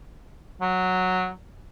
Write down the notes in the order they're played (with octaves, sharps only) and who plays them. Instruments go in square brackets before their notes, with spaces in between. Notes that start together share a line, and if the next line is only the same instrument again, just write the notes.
[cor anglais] F#3